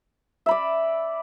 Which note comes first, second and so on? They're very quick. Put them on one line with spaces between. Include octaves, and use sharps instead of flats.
E5 B5 D5